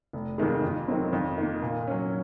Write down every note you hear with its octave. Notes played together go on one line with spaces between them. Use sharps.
F1
F2 C3 D#3 G#3
F2
D#3 F#3 C4
F2
D#3 A#3
A#2
F#3 C#4